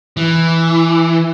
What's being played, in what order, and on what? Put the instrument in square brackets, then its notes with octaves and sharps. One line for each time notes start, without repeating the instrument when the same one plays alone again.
[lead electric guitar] E3